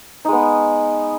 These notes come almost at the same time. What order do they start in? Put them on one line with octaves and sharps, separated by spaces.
D#4 G#3 B3